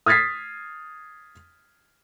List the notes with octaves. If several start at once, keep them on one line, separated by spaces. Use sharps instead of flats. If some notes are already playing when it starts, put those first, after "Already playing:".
D#6 F6 G#6 A6 B6 C7